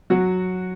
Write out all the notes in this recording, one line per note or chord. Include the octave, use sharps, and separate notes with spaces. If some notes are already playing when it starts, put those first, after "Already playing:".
F#3 F#4